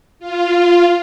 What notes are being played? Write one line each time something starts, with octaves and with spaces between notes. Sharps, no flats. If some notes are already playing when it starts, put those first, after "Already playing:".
F4